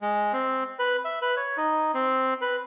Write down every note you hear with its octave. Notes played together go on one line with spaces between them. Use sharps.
G#3
C4
B4
E5
B4
C#5
D#4
C4
B4